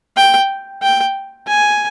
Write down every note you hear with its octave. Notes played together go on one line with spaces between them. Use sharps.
G5
G5
G#5